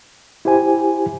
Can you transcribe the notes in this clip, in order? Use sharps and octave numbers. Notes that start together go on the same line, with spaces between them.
E4 G4 C5 G#5